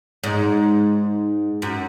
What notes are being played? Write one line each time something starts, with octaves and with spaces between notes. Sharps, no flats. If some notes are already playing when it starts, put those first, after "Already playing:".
G#2
F#2